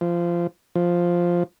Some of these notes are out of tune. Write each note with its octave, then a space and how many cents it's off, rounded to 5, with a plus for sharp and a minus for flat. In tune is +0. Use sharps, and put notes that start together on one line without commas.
F3 -20
F3 +0